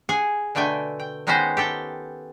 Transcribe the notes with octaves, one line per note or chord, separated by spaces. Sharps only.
G#4 F#5 G#5
B2 D3 A3 G5 G#5
G5
D#3 G#3 B3 C#4 D#4 C5
G4 A4 G5